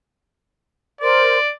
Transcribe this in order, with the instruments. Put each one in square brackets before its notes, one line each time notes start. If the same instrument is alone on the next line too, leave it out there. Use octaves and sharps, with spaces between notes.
[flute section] A#4 C5 C6 [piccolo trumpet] D5